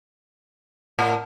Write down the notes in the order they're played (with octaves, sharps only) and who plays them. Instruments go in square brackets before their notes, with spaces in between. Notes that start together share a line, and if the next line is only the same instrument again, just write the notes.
[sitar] A2